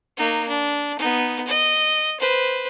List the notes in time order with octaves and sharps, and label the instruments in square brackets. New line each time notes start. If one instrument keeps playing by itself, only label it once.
[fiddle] A#3 D#4
D4
B3 D#4
D#5
B4 C5